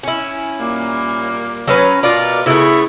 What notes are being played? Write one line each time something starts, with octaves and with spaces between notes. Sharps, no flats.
C#4 E4
A#2 G3 A#3
F#3 C#4 B4
B2 F4 A#4 D5
C#3 A3 B3 E4